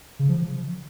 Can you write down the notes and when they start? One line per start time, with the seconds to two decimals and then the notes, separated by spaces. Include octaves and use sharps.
0.19 C#3
0.29 F3